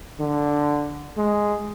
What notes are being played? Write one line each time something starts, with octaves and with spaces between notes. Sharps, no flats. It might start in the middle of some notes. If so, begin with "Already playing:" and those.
D3
G#3